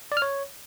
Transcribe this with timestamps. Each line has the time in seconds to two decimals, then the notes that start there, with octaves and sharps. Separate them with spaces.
0.12 D5
0.17 F6
0.22 C#5